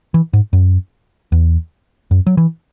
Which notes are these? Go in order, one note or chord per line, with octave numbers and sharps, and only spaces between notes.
E3
G#2
F#2
E2
F#2
F#3
E3